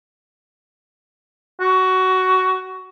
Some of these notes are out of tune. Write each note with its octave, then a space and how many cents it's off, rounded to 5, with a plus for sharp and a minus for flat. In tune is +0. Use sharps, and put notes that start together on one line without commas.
F#4 +15